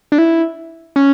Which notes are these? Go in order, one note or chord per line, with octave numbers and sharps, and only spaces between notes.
D4
E4
C#4